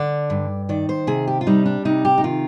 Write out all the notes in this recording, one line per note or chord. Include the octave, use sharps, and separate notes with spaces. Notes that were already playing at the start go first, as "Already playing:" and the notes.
Already playing: D3 D5
G2
D#3 D5
C5
C3 G#4
G4
F4
G3 D#4
D4
C3 D#4
G4
D#4
D#3 F4